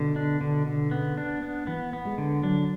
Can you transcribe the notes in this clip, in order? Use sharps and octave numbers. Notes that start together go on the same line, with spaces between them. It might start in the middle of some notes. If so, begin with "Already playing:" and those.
Already playing: B2 D3
D4
D3
D3
C#3 B3
D4
B3
E3 B3
B3
G#3
D3
F#3 D4